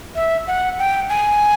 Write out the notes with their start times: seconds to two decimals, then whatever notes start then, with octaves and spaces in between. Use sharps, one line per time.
0.15 E5
0.47 F#5
0.79 G5
1.09 G#5